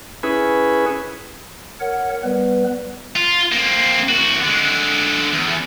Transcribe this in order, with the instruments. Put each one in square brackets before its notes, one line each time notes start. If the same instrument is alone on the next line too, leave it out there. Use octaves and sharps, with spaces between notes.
[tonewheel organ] C#4 E4 G#4 B4
[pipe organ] A#4 C#5 F#5
G3 B3 B4
[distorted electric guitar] F4
A#3 C4
C2 F#4
D3 G#3
E2